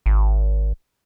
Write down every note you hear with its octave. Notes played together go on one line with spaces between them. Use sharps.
G#1